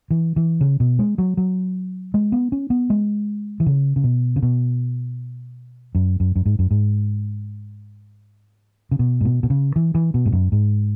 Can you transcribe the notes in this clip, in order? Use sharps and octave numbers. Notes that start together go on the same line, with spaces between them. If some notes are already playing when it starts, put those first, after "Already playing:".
E3
E3
C#3
B2
G#3
F#3
F#3
G#3
B3
C#4
B3
G#3
E3
C#3
C#3
B2
C#3
B2
F#2
F#2
F#2
G#2
F#2
G#2
C#3
B2
G#2
B2
B2
C#3
E3
E3
B2
G#2
F#2
G#2